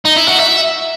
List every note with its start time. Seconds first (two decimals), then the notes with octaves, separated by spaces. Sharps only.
0.05 D#4
0.17 E4
0.28 F#4
0.40 E5